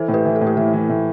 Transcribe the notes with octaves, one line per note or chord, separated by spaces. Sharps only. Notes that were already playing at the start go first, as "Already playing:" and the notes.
Already playing: E3 A4 C5
A2
G4 B4
E3
A4
A2
G4
E3 A4
E3
A2